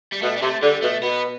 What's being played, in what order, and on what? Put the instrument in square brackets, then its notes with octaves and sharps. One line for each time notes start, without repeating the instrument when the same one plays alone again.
[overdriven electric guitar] G3
[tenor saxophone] B2 [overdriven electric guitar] A3
[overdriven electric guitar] G3
[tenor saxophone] C3 [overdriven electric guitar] A3
[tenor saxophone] D3 [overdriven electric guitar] G3
[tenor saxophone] B2 [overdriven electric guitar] A3
[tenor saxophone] B2 [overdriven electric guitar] B3